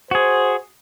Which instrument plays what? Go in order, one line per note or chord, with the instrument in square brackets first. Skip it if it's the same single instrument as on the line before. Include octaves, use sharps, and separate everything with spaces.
[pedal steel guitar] F#4 G#4 [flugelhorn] C5